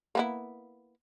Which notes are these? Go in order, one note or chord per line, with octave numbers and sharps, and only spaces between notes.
A#3 B3 E4